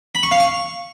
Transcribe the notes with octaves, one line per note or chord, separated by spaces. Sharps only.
B5
C#6
F5
C#6